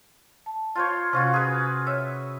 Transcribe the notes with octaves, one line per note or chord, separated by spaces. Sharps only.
A5
F4 C5 C#5
C3 C#4 F4 F#4
G#4 B4
C#5 E5